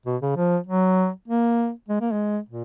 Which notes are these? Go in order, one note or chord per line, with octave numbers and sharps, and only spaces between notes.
B2
C#3
F3
F#3
A#3
G#3
A#3
G#3
A#2